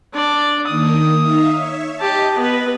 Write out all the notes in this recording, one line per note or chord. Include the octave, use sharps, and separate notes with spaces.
D4 D5
D#3 A#3 D#6
D#4 E5 F5
C#5 E5
G4 D#5 A5
B3 B4